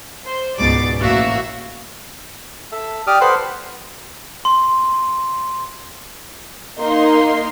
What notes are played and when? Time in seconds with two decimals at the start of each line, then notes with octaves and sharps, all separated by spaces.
0.24 C5
0.58 C#2 G#2 B2 D5 D6 A6
0.99 A1 A#3 F#4 E5 F5
2.72 A4 E5
3.07 G4 D5 D6 D#6 F6
3.21 A4 B4 C5 F#5 C6
4.45 C6
6.79 A#3 D#4 C6